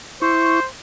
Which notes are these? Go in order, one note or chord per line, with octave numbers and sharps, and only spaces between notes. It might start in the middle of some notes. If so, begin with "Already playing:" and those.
E4 C5 C#6